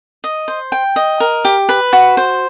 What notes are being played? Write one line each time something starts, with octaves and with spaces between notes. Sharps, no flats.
D#5
C5
G5
D#5
A#4
G4
B4
F#4
C5